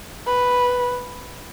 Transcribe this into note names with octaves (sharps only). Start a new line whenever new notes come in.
B4